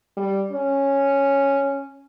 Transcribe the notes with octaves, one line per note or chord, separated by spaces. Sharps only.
G3
C#4